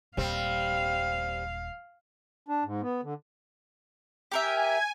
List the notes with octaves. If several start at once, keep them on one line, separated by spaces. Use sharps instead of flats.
D#1 G3 C4 F5
D4
G#2
B3
D3
G4 A#4 E5 G#5